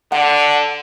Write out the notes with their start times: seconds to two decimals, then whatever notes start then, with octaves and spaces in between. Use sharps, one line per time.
0.12 D3 F#5